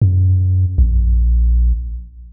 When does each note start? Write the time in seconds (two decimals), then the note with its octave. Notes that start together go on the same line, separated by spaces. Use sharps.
0.02 F#2
0.78 A#1